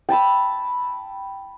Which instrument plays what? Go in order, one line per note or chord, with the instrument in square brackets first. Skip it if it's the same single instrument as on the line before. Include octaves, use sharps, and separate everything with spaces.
[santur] G5 A5 B5 E6